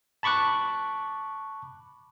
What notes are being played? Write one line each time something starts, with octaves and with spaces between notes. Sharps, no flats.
A5 B5 C#6 D6 F#6